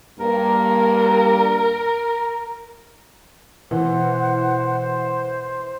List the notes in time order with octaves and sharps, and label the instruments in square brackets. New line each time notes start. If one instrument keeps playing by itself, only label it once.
[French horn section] G2 A#3 [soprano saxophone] A#4
[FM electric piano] B2 [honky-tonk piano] E3 [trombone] C5 [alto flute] F#5